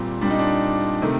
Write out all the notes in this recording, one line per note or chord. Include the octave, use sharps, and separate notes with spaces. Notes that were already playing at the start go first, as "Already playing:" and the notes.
Already playing: A#2 G3 C4
A#2 G3 D4
D#4
D4
C3 D#3 A3